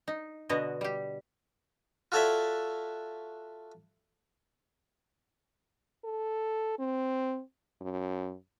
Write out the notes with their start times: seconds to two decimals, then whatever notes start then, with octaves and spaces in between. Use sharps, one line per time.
0.08 D#4
0.49 B2 D3 B3 F#4 D#5
0.81 G3 G4
2.12 F4 F#4 A4 C#5 D5 E5
6.04 A4
6.79 C4
7.81 F#2